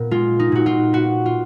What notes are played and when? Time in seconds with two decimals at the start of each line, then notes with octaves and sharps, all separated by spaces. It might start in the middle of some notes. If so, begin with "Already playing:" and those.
Already playing: A#2 B3 A#4
0.11 G#3 F4
0.39 D#4
0.52 A#2 F#4
0.66 F4
0.93 B3 F#4
1.26 F4